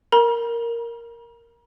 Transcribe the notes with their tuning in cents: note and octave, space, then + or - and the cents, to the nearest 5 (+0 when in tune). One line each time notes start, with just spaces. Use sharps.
A#4 +0 A#5 +45